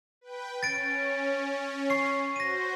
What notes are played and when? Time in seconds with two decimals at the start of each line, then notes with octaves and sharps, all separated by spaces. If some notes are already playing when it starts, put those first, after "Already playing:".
0.21 B4 G5
0.63 C#4 A6 D7
1.90 C#6 C7
2.36 F#4 C5 A#6 D#7